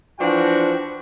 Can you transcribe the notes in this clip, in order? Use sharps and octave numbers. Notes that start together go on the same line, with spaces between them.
E3 F3 D4 F#4 G5